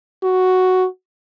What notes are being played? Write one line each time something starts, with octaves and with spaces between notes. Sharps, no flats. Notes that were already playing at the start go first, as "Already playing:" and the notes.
F#4